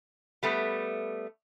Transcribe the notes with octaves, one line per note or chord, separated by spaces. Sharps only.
G3 A3 B3